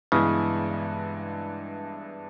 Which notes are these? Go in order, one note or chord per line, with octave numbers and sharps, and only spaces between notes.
G2 C#3 E3 G#3 B3 E4